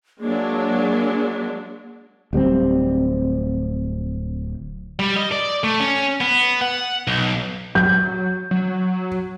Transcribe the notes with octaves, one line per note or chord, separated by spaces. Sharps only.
F#3 G#3 A#3 D4
D1 G3 A#3 C4
G3
D#5
D5
A3
C#4
B3
F#5
B1
F#3 G6
F#3